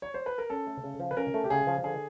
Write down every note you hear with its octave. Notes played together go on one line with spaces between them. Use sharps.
C#5
C5
B4
A#4
C#4 A4
A3
C#3
F3
B4
C#4 A#4
A3
G4
C#3 G#4
F3
D3 G#4